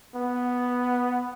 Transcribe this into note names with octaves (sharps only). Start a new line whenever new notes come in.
B3